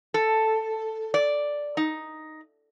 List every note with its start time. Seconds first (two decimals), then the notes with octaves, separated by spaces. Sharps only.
0.14 A4
1.14 D5
1.77 D#4